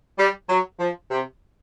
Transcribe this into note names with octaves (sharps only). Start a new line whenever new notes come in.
G3
F#3
F3
C3